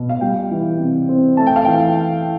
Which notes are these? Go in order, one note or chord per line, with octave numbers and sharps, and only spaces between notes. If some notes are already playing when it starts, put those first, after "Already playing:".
Already playing: B2
F5
G3 G5
E3
C3
C4
A3 A5
G5
F5
E3 G5